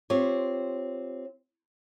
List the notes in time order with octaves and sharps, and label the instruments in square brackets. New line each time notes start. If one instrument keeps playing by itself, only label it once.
[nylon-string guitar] C4 F4 G4 C#5